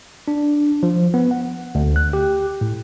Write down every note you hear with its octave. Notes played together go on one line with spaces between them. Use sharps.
D4
F3
B3
F#5
D2
F#6
G4
A2